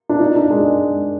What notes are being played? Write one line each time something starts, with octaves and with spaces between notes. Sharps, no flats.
D4
D#4
D4
G#3